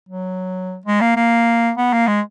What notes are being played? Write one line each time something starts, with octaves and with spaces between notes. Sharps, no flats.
F#3
G#3
A#3
A#3
B3
A#3
G#3